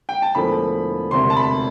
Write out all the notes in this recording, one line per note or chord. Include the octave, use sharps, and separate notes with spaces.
G5
A5
E1 E2 D3 F3 A3 B5
E1 D2 C3 C6
A5
B5